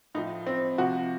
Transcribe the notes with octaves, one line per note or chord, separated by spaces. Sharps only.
A2 F3 D#4
C4
C3 F3 F#4